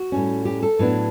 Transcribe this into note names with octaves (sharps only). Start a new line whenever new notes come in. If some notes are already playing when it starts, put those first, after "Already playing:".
Already playing: F#4
A2 G3 C#4
G4
A4
A2 F#3 B3 D4